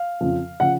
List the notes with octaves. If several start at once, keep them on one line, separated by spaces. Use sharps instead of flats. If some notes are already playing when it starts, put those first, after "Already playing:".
Already playing: F5
F2 C#3 F3
C#3 F3 F#5